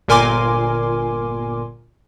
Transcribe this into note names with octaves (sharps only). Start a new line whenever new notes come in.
G1 A#2 A#4 G#5 C6 D6